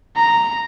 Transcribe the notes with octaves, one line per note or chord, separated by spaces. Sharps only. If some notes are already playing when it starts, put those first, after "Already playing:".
A#5